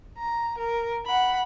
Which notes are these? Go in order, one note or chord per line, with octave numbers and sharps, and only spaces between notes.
A#5
A#4
F#5 B5